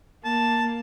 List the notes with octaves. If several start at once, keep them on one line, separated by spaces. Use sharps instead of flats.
A#3 A5